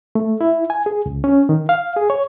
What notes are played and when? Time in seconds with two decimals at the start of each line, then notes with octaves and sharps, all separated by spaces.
0.15 A3
0.41 E4
0.70 G#5
0.86 G#4
1.06 C#2
1.24 C#4
1.49 D#3
1.69 F5
1.96 G#4
2.10 C#5